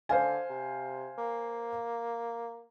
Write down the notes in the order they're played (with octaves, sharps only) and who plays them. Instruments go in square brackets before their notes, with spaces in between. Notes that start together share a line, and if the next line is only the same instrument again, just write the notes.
[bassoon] D3 [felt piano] C5 F5 G#5
[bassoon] C3
A#3